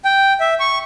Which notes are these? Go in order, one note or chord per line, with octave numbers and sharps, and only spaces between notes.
G5
E5
C#6